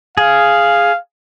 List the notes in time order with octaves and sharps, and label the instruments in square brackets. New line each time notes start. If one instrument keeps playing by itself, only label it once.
[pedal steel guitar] G#4 [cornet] F5